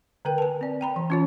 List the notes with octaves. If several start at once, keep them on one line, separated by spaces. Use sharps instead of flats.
D3 A#4 B4 G5
G#5 A5
C4 D5
G5 A#5 B5
E3
C#4 F4 C#5